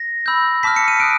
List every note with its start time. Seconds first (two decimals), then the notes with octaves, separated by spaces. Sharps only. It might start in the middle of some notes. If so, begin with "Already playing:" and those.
Already playing: A#6
0.26 B5 E6 G6
0.63 A5 D6 F6 B6
0.76 C#7
0.88 D#7
1.00 D#6 F#6 D7